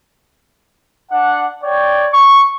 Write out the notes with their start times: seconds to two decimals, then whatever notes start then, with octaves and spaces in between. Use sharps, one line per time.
1.10 D4 F#5
1.63 C#5 D5 G5
2.12 C#6